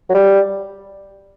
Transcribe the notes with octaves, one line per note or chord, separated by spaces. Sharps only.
F#3
G3